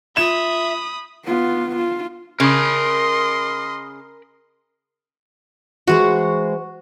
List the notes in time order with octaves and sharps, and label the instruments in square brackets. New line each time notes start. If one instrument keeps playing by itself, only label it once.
[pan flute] F4 [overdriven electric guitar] E5 [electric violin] B5 D#6 [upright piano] E7
[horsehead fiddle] B3 F4
F4
[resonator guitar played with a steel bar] C#3 [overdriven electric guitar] A#4 B5 [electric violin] D#5 C6
[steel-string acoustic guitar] E3 G#3 C5 [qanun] F#4